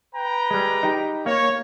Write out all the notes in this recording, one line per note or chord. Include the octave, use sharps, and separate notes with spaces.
B4 G5 A#5
G3 G#3
D#4 G4
A#3 C#5